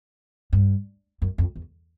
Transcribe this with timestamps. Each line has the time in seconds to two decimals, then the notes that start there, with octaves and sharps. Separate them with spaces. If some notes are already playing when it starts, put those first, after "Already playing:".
0.53 G2
1.22 F#2
1.38 F2
1.56 E2